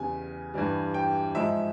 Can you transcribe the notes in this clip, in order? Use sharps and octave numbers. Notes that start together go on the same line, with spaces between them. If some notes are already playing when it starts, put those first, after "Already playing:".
Already playing: E2 C#3 G3 G#5
G2 E3 G3
G5
G#2 F3 G#3 E5